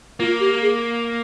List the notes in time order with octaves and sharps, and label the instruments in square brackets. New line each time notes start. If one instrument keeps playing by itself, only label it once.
[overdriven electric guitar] A#3 [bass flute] F4
[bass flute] G4
G#4